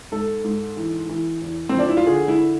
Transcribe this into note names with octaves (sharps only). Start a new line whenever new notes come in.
G#2 A4
G#2
E3
E3
E2
C4
F3 D4
E4
F4
D3 G#4
E4